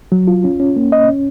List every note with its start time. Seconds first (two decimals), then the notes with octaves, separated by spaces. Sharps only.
0.12 F#3
0.27 F4
0.44 C#4
0.60 C#4
0.76 A#3
0.92 D#5
1.09 C#4